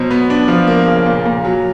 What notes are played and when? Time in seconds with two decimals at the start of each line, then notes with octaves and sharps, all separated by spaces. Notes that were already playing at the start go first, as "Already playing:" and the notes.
Already playing: B2 F#3 C5
0.11 B3
0.30 D4
0.48 F3
0.67 A#3
0.87 C#3
1.06 A#2
1.25 A#2
1.44 F#3